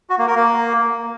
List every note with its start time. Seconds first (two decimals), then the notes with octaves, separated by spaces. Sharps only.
0.10 F#4
0.18 A#3
0.27 A#4
0.36 A#3